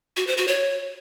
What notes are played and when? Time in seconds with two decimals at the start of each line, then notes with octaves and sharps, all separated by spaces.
0.17 F#4
0.27 C5
0.37 F#4
0.48 C#5